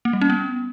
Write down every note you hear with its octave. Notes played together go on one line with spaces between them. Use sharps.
A#3
G3
C#4
B3